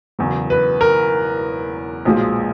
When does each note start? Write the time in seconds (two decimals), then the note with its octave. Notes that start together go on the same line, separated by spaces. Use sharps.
0.19 E1 E2 C#3 F#3
0.50 B4
0.81 A#4
2.05 B1 A#2 F3 G#3